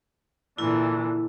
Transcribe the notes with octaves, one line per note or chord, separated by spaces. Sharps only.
A#2 D3 E3 E4